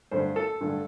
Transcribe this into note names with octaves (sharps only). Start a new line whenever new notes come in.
G2 D3 A3 C5
A4
G2 D3 A3